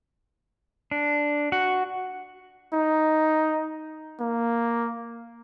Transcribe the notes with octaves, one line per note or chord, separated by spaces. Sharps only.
D4
F#4
D#4
A#3